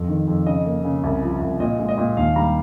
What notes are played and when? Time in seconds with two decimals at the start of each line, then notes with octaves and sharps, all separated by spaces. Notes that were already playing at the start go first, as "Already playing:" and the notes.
Already playing: F2
0.08 D#3
0.28 F2
0.46 C#3 D#5
0.65 A#3
0.85 C#3
1.04 C2
1.22 F3
1.41 C2
1.60 A#2 D#5
1.79 G#3
1.89 D#5
1.98 A#2
2.17 D#2 F5
2.36 G3 A#5